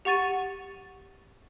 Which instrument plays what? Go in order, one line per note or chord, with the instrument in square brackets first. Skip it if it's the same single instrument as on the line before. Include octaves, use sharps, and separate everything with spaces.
[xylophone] G4 F#5 C#6 A6 D#7